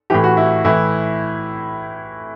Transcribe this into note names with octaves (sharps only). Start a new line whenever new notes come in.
A2 E3 G4
F#4
E4
A2 E3 E4